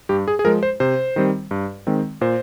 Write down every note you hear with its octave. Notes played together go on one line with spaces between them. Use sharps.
G2 G4
G#4
G#4
F3 G#3 A#4
C5
C3 C5
D#3 G3 C4
G2
D#3 G#3 C4
A#2 C5